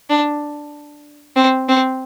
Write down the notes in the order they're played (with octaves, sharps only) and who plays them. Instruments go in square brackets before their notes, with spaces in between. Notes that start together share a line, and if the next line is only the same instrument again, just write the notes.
[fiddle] D4
C4
C4